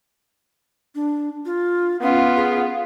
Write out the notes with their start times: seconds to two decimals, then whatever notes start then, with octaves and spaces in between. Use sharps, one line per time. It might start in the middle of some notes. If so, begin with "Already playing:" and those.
0.95 D4
1.46 F4
2.02 B3 C#4 F4
2.36 G#4